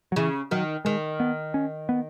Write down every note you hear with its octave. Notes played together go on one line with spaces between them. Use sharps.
F#3
C#3 E3
D#3 F#3
D#3 G#3
B3
C#4
B3